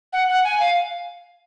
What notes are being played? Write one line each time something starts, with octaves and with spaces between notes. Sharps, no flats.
F#5
F#5
G#5
F5